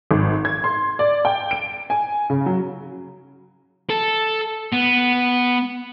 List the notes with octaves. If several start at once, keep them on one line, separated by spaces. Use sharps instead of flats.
G#1
G#6
C6
D5
G5
D7
G#5
C#3
F#3
A4
B3